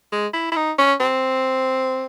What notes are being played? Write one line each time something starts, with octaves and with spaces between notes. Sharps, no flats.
G#3
E4
E4
D#4
C#4
C4